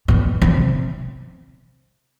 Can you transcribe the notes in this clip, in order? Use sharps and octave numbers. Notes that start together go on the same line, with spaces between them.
B2
C3